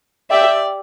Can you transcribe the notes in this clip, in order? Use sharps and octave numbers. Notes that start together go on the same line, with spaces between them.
G4 D5 E5 G5